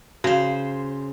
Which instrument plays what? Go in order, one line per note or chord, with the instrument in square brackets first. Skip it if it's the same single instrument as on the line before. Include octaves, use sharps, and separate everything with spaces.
[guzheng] C#3 C5 [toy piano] F#4